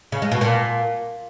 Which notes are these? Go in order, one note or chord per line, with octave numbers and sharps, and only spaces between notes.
C#3
G#3
B2
A#2